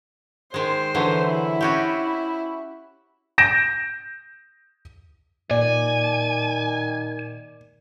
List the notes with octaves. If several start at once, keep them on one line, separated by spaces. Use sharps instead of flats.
D#3 G#3 C5
D3 E3 F#3
E4
C#4 F#4 G4
G6 A#6 D7 E7
A#2 D#3 D5 G#5